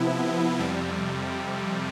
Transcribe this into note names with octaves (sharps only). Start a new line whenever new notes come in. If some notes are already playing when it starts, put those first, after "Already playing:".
Already playing: C3 F3 B3 E4
F2 C3 G3